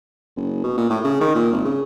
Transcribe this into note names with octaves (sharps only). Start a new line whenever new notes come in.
F#1
B2
A#2
A2
C#3
D#3
A#2
G#1
C#3